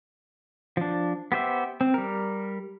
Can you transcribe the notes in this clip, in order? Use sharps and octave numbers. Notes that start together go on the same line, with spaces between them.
F3 D4
B3 G4 C5 E5
C4
G3 A#4